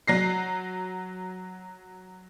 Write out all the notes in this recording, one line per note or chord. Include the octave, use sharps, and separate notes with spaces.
F#3 A#6 C7